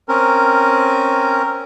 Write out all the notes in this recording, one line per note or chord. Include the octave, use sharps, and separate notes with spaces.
C4 C#4 A#4